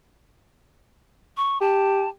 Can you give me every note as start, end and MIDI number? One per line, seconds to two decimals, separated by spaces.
1.37 1.61 85
1.61 2.06 67
1.61 2.09 81